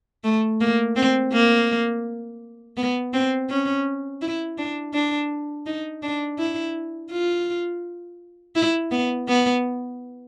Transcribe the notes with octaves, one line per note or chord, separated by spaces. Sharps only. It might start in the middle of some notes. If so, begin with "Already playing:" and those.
A3
A#3
C4
A#3
B3
C4
C#4
E4
D4
D4
D#4
D4
E4
F4
E4
B3
B3